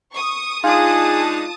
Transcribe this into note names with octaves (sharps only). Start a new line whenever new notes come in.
C#6 D#6
G#3 D4 D#4 F4 G#4 A5 D#6